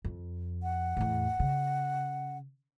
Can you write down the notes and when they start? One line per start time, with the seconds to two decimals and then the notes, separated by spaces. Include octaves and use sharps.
0.05 F2
0.63 F#5
0.97 E2 A2
1.40 C#3